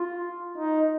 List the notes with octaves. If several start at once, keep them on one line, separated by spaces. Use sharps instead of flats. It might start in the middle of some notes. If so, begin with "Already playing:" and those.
Already playing: F4
D#4